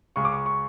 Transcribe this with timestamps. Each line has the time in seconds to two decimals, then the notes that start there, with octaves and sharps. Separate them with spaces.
0.16 C#2 C#3 G#3 C#6
0.25 D6
0.32 C#6
0.46 C#6